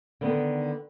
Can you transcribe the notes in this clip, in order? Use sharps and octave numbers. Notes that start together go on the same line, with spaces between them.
D3 D#3 B3